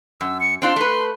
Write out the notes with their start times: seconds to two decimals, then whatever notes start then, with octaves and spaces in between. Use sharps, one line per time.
0.21 F#2 E6
0.40 C#7
0.62 C4 D4 F4 C6
0.76 A3 B4